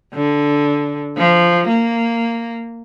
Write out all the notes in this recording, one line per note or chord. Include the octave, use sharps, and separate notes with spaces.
D3
F3
A#3